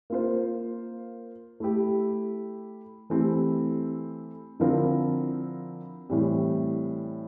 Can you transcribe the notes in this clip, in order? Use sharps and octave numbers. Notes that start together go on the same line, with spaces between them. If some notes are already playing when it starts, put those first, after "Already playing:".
A#3 F4 C5
A3 E4 G4
E3 A3 C4 E4 G4
D3 F3 C4 E4 A#4
A2 E3 G3 C4 G4